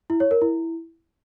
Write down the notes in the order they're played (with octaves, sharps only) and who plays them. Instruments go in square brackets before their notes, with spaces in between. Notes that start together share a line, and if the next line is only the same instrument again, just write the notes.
[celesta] E4
C#5
A#4
E4